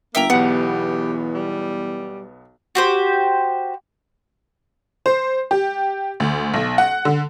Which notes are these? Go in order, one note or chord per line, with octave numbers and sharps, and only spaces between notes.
G1 A#3 E5 G5 A#5
B1 E2 B3 G4 F#5
G3
F#4 G4 C5
C5
G4
D2
B1
F#5
D3